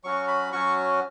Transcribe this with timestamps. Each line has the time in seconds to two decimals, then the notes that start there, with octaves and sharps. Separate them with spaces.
0.04 F#3 C#4 F#4 C#6
0.28 B5
0.52 F#3 C#4 F#4 C#6